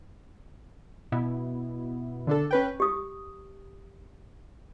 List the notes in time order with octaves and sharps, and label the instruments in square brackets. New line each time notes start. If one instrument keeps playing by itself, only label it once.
[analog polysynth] B2 B3 E4
[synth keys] D3 D4 A4
C#4 B4 G5
[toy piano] G4 D#6